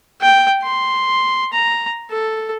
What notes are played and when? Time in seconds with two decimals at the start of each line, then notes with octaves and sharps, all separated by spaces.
0.21 G5
0.63 C6
1.53 A#5
2.11 A4